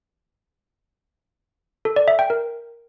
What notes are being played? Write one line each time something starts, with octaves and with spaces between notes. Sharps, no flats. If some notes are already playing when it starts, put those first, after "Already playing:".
A4
D5
E5
G5
A#4